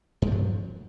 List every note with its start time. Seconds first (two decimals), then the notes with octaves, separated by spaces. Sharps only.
0.22 G2
0.27 F3
0.32 F#3